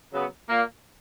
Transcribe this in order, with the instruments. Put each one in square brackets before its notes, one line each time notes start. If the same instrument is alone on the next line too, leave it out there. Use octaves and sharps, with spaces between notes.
[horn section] C#3 F#3 B3
A#2 A#3